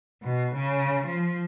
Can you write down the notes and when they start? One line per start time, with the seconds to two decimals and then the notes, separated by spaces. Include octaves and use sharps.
0.23 B2
0.55 C#3
1.05 F3